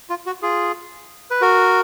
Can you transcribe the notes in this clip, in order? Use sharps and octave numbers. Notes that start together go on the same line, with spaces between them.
F4
F#4
F4 G#4
B4
F#4 A#4